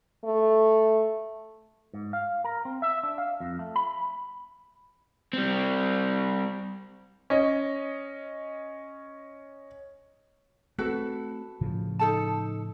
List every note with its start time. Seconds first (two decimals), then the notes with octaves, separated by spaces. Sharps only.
0.24 A3
1.94 G#2
2.13 F5
2.44 A#4
2.65 C4
2.82 E5
3.03 D4
3.18 F5
3.40 F2
3.59 A3
3.76 B5
5.33 G3 C4
7.30 C#4 D#5
10.78 A3 C4 F#4 A4 B4
11.61 A2 C#3 F3
11.99 D#4 A4 A5